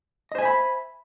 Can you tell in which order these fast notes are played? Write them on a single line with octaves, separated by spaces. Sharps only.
D#5 C5 G#5 E5 B5